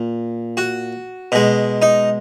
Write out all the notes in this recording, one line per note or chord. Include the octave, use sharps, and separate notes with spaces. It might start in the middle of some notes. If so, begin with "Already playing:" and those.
Already playing: A#2
F#4
B2 G#3
D#4